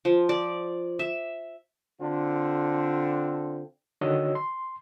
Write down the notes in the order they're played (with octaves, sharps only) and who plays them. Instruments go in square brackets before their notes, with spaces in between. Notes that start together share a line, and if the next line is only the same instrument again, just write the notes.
[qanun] F3
D5
E5
[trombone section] D3 C4 D4 F4 A4
[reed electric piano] D3 D#3 F#4 C#5 D#5 E6
C6